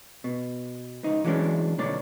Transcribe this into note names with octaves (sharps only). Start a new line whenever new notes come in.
B2
C#2 D#4
E3 F#3 G#3 C#4 D4
B1 D3 A#3 C#5 D5